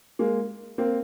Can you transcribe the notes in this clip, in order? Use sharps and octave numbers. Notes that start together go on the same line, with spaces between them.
G#3 A#3
A#3 C4